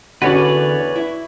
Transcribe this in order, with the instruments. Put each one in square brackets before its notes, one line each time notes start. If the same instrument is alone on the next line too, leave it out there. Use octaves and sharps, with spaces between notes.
[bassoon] E2 [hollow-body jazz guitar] D3 C#4 [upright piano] F#4 [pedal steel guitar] B4 C#5 D5
[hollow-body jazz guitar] E4